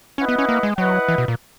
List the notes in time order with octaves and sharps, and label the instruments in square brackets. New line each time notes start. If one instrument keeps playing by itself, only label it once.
[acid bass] C#4 [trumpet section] E4 B4 D#5 F#5
[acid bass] B3
C#4
A#3
G#3
[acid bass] F#3 [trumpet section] E4 B4 D#5 F#5
[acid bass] E3
B2
A#2